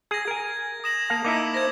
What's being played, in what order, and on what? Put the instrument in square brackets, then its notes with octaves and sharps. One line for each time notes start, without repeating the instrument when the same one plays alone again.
[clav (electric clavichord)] G#4 [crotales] G#6 A#6
[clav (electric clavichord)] A#4 G#5
[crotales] D#6 E7 F#7 [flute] A#6
[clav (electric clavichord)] A#3 F5 [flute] A5
[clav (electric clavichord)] A#3 D#4 E4 [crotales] D6 E6
[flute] C5 [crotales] G#6 A#6